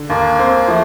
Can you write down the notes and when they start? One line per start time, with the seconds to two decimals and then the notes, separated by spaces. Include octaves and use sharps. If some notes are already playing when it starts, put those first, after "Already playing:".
Already playing: D3
0.09 D#2 A#3
0.39 C4
0.68 F3 A3